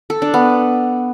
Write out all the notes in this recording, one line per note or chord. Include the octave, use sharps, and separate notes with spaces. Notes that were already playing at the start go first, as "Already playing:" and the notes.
A4
D4
B3